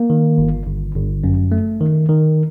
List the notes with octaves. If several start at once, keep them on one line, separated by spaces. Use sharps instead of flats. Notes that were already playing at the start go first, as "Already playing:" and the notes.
Already playing: A#3
D#3
G1
G1
G1
F#2
A3
D#3
D#3